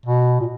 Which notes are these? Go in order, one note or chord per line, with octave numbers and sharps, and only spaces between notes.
B2
A#2